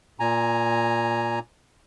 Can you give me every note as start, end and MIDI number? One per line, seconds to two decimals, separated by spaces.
0.20 1.39 46
0.20 1.39 80
0.20 1.39 82